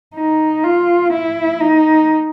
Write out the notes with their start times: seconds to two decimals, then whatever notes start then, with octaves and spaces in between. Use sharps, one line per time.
0.15 D#4
0.64 F4
1.13 E4
1.61 D#4